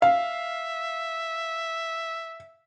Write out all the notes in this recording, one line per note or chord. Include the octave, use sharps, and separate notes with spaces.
E5 F5